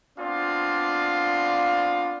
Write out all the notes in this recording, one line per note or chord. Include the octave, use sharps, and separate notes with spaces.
B3 C4 D4 F4 D5 F5